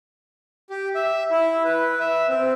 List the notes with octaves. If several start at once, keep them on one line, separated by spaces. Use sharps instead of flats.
G4
E5
E4
B4
E5
C4